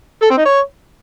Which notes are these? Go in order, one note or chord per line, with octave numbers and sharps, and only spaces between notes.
A4
C4
D#4
C#5